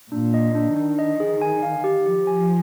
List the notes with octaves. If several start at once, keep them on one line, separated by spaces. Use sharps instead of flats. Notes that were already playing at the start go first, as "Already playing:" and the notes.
A#2 D4
D#5
D4
D#3 D4
D#5
G#4
G#5
F5
G4
F3 G4
G#5